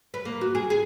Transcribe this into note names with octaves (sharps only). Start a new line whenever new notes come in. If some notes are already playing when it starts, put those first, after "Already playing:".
B4
A#3
F#4
G#4
G#4